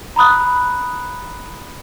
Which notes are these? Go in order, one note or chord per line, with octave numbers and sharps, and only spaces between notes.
A#5 B5 D#6 F#6